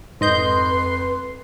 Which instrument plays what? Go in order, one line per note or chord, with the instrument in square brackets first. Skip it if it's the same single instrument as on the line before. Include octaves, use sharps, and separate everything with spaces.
[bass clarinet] F2 [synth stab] G#2 D#5 G6 [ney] B4 [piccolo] C6